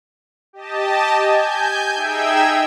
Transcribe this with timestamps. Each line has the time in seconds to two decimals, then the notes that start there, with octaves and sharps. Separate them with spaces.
0.53 G4 D#5 A5
1.14 G#5 G6
1.95 D#4 G#4 E5 G5 E6 G#6